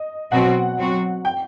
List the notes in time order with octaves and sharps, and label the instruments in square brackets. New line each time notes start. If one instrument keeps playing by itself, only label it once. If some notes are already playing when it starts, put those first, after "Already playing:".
Already playing: [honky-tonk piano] D#5
[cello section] B2 F#3 C4 F#4 [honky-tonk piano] F#5
[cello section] F#3 C4 F#4
[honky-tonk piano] G5